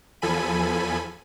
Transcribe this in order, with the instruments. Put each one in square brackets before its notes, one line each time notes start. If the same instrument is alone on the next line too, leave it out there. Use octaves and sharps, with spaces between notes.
[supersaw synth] E2 F3 A4 G#5 B5 D#7